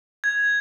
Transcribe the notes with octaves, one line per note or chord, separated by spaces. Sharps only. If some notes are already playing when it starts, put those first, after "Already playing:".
G#6